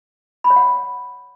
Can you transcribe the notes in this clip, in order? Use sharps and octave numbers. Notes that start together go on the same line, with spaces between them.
B5
C#5
F#5